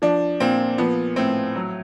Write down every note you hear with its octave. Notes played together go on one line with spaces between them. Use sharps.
F3 D4
A#2 C4
F3 B3
A2 C4
F#3